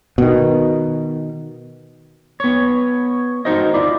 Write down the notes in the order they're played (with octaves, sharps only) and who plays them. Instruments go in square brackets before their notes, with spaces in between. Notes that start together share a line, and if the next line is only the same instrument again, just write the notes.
[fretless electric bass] B2 D#3
[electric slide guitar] B3 C#5
D#4 F#4 A#4 C5 D#5
E4 F4 D5